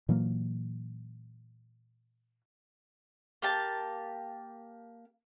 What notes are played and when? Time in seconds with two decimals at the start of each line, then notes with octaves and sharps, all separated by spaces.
0.09 A#2 E3 F#3 A#3
3.42 A#3 G4 A5